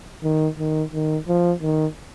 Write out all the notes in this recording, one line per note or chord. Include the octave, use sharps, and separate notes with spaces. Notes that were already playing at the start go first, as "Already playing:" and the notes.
D#3
D#3
D#3
F3
D#3